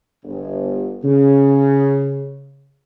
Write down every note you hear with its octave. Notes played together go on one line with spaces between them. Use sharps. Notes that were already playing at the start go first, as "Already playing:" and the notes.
G1
C#3